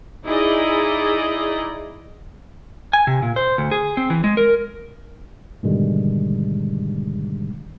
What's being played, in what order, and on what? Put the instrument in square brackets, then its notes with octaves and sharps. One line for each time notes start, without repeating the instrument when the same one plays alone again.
[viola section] D#4 E4 G#4 D5 D#5
[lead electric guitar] G#5
C3
A#2
C5
D2
G#4
C4
E3
G#3
A#4
[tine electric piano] G#2 B2 D3 D#3 G3 G#3